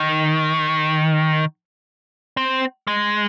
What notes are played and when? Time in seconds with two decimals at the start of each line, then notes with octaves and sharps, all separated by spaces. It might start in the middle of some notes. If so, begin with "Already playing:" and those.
Already playing: D#3
2.37 C4
2.87 G#3